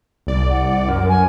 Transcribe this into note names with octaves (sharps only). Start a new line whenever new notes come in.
C2 D5
F#5
F#2 A#4
G#5